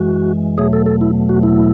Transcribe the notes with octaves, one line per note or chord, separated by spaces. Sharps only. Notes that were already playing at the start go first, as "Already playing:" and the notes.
Already playing: F#2 E3 G#3 F#4
E2 B2 F#3 A3 G#4
A4
A4
E4
F#4
E4